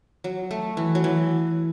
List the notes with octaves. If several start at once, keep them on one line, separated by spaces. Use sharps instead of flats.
F#3
A3
E3
F#3
E3